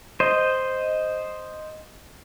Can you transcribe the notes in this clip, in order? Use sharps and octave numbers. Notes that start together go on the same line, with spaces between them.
C5 D#5